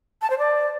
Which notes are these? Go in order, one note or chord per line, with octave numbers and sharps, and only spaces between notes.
A5
C5
D5